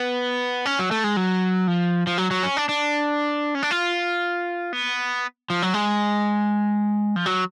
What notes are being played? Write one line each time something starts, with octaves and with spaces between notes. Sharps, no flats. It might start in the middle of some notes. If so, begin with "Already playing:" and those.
Already playing: B3
C#4
F#3
A3
G#3
F#3
F3
F3
F#3
F#3
C#4
D4
D4
C#4
D4
F4
B3
F3
F#3
G#3
F3
F#3